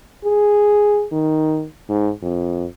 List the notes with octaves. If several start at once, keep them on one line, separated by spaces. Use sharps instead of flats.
G#4
D#3
G#2
F2